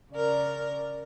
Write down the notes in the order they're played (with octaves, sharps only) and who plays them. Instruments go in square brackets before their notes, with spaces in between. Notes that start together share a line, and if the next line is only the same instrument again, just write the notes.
[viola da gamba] C#3 A#4 [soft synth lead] D5